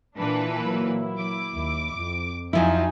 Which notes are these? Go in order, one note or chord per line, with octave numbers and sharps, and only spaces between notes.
A#2 E3 D4 B4 A5
F#3 A#3 E4
D6
D#2
F2
F2 F3 F#3 D#4 E4 F#4 G#5